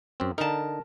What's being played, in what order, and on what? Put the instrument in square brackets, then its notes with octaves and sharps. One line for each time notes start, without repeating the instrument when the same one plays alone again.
[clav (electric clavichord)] F#2 C4
[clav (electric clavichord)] D3 D#4 [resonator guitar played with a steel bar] A#4 A5